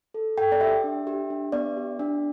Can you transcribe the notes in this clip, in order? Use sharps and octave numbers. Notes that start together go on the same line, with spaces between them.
A4
A4 G5
D5
G4 E5
D4
G4
D4
B3 D5
G4
D4